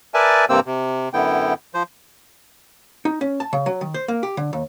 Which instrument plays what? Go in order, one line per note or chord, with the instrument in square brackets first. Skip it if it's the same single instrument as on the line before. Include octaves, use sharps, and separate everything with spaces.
[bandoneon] A#4 B4 D5 E5 G#5 A5
G2 C3 A#3 C4 C5 E6
C3
F#2 D3 B3 E4 G5
F3 C5
[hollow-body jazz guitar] D#4
C#4
A5
C#3
F#3
D#3
C5
A#3
G4
D3
D#2